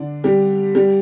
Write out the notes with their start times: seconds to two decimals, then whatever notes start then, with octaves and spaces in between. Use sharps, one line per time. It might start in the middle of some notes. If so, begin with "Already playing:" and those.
Already playing: D3 D4
0.24 G3 G4
0.75 G3 G4